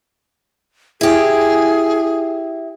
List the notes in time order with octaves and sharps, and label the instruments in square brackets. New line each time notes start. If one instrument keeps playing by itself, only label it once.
[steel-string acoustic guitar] E4 G4 [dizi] G#4